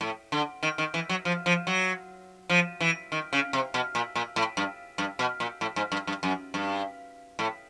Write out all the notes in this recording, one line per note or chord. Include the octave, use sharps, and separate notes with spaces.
A2
D3
D#3
D#3
E3
F#3
F3
F3
F#3
F3
E3
D#3
C#3
C3
B2
A#2
A#2
A2
G2
G2
B2
A#2
A2
G#2
G2
G2
F#2
G2
A2